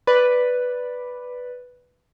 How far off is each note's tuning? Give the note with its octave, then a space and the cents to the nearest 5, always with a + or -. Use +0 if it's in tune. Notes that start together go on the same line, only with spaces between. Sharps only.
B4 +0 D5 +0